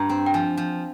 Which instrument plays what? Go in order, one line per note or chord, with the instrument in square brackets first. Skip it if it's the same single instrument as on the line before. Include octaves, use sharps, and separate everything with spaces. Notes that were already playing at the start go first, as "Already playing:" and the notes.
Already playing: [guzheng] G2 [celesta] A#5
[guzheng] C4
[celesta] G5
[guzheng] F3 [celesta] G#5
[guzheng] F3